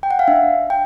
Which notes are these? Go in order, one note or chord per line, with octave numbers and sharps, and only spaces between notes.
G5
F#5
F5
D4 E5
G5